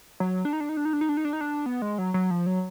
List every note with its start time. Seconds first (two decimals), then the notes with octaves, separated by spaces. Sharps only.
0.20 F#3
0.45 D4
0.53 D#4
0.60 D4
0.69 D#4
0.77 D4
0.85 D#4
0.93 D4
1.01 D#4
1.09 D4
1.17 D#4
1.25 D4
1.33 D#4
1.41 D4
1.66 B3
1.82 G#3
1.98 F#3
2.14 F#3
2.31 F3
2.46 F#3